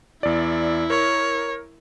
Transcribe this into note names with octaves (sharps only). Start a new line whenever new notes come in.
E2 E4 D5
A#4 C#5